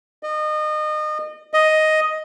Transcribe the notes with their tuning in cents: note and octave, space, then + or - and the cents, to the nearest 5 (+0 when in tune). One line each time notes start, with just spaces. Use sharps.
D#5 -30
D#5 +5